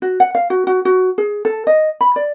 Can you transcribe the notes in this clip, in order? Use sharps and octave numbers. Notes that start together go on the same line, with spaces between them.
F#4
F#5
F5
F#4
F#4
F#4
G#4
A4
D#5
B5
D5